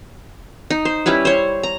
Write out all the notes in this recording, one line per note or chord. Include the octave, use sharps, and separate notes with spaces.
D#4
C5
G3 C#4 E4 B4
C5 C#5
A#5